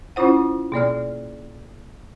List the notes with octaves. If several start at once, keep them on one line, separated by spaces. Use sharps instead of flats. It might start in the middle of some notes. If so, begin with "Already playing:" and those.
C#4 E4 F4 C5 F#5
B2 A#3 D5 F6